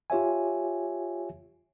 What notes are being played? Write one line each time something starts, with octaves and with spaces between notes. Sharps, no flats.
F4 G4 C#5 E5 G#5